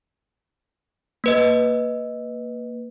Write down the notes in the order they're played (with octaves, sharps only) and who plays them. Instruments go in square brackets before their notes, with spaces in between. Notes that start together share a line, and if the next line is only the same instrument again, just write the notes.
[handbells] A#3 B4 D#5